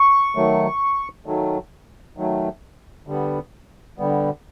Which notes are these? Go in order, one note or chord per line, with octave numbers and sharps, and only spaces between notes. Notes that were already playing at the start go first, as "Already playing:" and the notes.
Already playing: C#6
D#3 F#3 A3
D#3 F#3 A3
D#3 F#3 A3
D3 G3 B3
D3 G3 B3